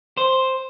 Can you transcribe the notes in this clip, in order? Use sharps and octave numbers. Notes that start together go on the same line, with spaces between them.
C5